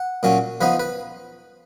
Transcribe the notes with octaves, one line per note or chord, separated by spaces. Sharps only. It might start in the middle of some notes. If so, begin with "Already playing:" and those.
Already playing: F#5
A#2 F#3 C#4
F3 B3 D#4 B4
B4